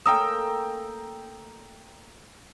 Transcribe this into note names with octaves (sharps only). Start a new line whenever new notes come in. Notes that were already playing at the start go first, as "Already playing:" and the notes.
A3 A#3 C#4 G5 A#5 D#6 E6